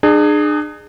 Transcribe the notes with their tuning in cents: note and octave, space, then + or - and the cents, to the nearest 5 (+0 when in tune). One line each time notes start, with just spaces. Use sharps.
D4 +40 G#4 +0